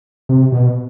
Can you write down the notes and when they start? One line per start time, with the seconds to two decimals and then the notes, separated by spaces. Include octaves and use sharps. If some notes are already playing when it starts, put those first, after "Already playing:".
0.29 C3
0.52 B2